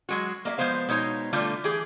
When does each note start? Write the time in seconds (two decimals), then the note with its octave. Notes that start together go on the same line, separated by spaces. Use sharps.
0.09 F#3 G#3 F#4
0.45 A#3 D#5 E5
0.58 F3 G#3 B3 C5 F5
0.89 B2 G#3 D#4 C#5
1.33 D3 G3 A3 F4
1.64 E3 G4 G#4